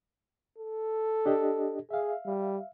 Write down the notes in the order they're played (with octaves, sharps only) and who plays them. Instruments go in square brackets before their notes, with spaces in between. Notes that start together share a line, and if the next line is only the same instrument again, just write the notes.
[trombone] A4
[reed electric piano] D4 G4 D#5
[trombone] G#4 [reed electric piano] E5 F5
[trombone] G3